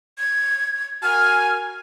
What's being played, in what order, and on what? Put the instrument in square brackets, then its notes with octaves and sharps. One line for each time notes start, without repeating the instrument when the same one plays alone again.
[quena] G#6
[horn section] F#4 A#4 G#5 [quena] F6